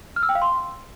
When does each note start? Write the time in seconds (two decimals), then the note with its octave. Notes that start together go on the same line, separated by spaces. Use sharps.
0.16 F6
0.23 E6
0.29 G5
0.35 F5
0.42 C6